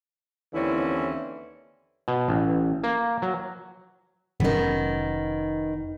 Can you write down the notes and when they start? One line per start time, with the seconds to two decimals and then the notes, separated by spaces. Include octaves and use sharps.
0.54 D#2 D3 E3 C4 C#4 E4
2.08 B2
2.28 A1
2.84 A#3
3.22 F#3
4.40 F1 D#3 F#3 B3 C#4